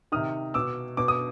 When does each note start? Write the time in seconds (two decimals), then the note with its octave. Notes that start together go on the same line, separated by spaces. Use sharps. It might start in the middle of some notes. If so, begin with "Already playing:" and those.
0.12 C3 D#3 D#6 F6
0.54 B2 D6 E6
0.97 B2 D6
1.08 D#6